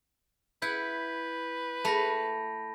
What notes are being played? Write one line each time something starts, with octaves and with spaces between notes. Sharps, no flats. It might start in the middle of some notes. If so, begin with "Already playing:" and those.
E4 B4 F#5 G6
A3 A5 B5 A#6